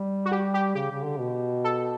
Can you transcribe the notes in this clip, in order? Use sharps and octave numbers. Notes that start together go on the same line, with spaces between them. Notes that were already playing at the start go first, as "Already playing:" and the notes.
Already playing: G3
F#4
G4
G4
C#3 G4
C#3
D3
B2
A4